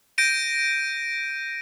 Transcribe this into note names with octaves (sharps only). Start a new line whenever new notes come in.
G6 A#6 D7 D#7